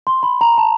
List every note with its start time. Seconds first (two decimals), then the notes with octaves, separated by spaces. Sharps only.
0.07 C6
0.23 B5
0.41 A#5
0.58 A5